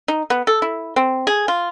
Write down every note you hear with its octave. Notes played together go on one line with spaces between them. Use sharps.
D#4
B3
A4
E4
C4
G#4
F4